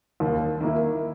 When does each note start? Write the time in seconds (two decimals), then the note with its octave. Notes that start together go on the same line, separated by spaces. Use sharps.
0.20 D#2
0.60 D#3 A#3 E4